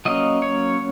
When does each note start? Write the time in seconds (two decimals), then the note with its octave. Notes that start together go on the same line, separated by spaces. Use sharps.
0.05 F#3 A#3 C#4 D#5
0.42 C#5